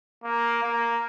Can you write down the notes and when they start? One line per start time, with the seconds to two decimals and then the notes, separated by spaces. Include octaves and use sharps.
0.24 A#3
0.63 A#3